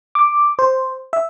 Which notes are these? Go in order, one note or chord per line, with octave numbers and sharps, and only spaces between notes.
D6
C5
E5